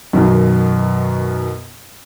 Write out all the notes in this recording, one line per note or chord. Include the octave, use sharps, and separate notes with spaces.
F#2 B2 D#3